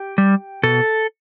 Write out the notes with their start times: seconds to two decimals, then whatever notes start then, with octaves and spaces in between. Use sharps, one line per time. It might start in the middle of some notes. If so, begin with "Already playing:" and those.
Already playing: G4
0.18 G3
0.63 B2 A4